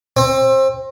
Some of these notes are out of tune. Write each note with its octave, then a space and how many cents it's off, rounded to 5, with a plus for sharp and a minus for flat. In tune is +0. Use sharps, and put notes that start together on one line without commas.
C4 +30